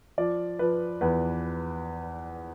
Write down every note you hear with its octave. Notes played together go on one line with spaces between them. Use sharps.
F3 D5
F3 B4
E2 B4